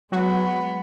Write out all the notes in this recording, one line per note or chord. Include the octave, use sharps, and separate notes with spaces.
F#3 G#3 B3 F#4